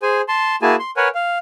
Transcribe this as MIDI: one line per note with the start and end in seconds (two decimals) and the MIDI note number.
0.02 0.21 68
0.02 0.21 72
0.02 0.21 80
0.28 0.56 81
0.28 0.56 84
0.62 0.76 58
0.62 0.76 64
0.62 0.76 66
0.62 0.76 68
0.62 0.76 80
0.62 0.76 81
0.80 0.91 84
0.97 1.08 70
0.97 1.08 71
0.97 1.08 73
0.97 1.08 78
0.97 1.08 80
1.15 1.38 77